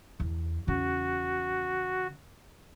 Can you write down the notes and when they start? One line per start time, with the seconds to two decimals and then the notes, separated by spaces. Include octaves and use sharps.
0.20 E2
0.67 E2 C#3 F#4